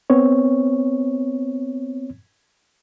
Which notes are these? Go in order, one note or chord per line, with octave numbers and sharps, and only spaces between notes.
B3 C4 C#5